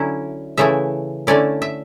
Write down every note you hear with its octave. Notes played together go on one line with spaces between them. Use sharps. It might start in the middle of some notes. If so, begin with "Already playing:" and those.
Already playing: D3 F#3 C#4 E4
C#3 E3 A3 E4 E5
D3 A3 C#4 E4 D5
E5